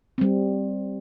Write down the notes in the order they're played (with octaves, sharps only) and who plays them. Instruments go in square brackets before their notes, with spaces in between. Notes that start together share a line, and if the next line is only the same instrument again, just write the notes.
[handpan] G3 C4